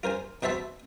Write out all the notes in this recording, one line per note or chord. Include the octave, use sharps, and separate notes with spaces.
F4 A#4 C5 G#5
B2 F#4 C5 E5 A5 B5